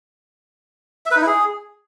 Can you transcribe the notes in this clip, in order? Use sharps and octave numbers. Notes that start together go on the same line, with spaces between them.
E5
B4
D#4
E4
G#4